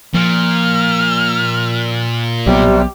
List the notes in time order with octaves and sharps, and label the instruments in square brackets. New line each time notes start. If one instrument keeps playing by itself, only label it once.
[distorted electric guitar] A#2 [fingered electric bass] F3 [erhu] F6
[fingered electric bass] B1 F#3 B3 [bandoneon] C3 G3 [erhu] G4